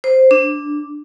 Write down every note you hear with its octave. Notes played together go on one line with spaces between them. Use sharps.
C5
D4